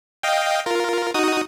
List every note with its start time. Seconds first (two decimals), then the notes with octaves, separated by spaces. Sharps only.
0.23 D#5 F5 G5
0.66 F4 A#4
1.14 D#4 F#4 D#6